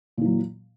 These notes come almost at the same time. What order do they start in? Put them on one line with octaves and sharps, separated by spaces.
A#2 E3 F#3